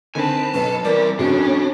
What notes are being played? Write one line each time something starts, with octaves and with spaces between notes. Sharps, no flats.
D3 D#3 C4 B4 G#5 A5
B1 F#3 A4 B4
E3 G3 C4 A#4 D5 A#5
F2 A2 C#4 D4 F#4